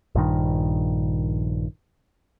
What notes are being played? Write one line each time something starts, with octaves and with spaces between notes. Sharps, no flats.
A#1 G2 D#3